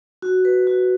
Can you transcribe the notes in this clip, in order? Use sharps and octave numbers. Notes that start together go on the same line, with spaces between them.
F#4
B4
F#4